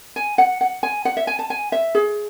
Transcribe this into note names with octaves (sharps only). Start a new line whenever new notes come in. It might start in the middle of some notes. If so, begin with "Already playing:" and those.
G#5
F#5
F#5
G#5
F#5
E5
G#5
A5
G#5
E5
G#4